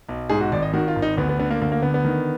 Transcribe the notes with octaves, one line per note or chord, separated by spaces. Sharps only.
B1
G#2 G#4
F#4
G#1 D5
D#5
D#3 F#4
F4
G#1
D#4
D2 B3
B3
D3 B3
A#3
D2 A#3
A#3
D3 B3
B3
D#3